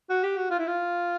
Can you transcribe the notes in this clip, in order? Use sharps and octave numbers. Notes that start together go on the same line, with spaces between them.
F#4
G4
F#4
F4
E4
F4